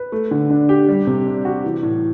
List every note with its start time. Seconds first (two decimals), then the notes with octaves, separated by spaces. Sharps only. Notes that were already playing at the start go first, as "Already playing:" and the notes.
Already playing: B4
0.12 A3
0.31 D3
0.50 D4
0.69 G4
0.89 G3
1.07 C3
1.26 D4
1.45 F#4
1.64 E3
1.83 A2